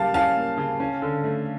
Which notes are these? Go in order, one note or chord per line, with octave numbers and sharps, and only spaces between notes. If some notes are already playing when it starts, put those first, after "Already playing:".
Already playing: C#3 G3 A#3 F5 A5
C#4 F5 A5
A#3
C#3
C#4
D3
A3